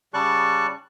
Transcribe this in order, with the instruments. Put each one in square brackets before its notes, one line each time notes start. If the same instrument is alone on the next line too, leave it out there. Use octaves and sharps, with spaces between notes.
[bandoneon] C#3 G3 D5 A5 C#6 F#6